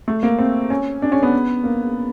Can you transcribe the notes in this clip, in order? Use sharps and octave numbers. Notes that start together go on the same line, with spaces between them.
A3
A#3
C4
C#4
D4
C#4
B3
A#3